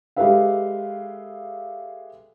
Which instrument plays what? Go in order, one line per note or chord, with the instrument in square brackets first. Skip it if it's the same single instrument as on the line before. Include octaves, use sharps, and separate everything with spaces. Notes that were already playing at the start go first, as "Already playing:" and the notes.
[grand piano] G#3 G4 A4 B4 E5 F5